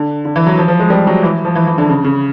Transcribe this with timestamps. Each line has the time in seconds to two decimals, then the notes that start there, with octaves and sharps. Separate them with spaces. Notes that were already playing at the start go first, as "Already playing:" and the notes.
Already playing: D3
0.25 D3
0.36 E3
0.47 F#3
0.58 F3
0.68 F3
0.80 G#3
0.90 G3
1.07 F#3
1.23 E3
1.45 F3
1.55 E3
1.67 E3
1.78 D3
1.89 C#3
2.04 C#3